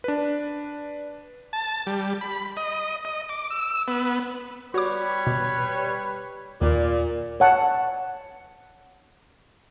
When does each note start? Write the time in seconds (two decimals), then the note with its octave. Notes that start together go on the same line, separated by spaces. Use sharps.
0.04 D4 B4
1.53 A5
1.87 G3
2.21 B5
2.57 D#5
3.05 D#5
3.29 D6
3.50 E6
3.88 B3
4.74 G3 F#4 B4 C#5 D6
5.27 B2
6.62 D#2 A#2 D5
7.40 C#5 F#5 A5